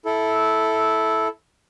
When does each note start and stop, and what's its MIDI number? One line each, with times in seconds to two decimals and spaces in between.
0.05 1.28 64
0.05 1.28 69